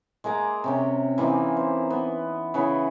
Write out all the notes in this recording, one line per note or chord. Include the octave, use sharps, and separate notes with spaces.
G#3 A#3 A#5 D6
C3 C#4 G5
E3 A#3 C4 D#4
C5
B3
C#3 B3 E4 B5